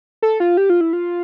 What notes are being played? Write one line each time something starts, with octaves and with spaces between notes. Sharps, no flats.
A4
F4
G4
F4
E4
F4